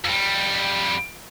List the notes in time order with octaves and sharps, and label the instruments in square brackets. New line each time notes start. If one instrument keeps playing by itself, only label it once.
[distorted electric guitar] F2 G3